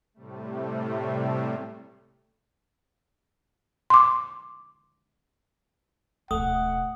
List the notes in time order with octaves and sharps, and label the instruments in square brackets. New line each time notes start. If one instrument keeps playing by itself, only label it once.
[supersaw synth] A2 C3 G3 A3
[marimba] C6 D6
[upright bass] D1 B1 [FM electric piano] A3 [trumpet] F#5 [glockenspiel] D#6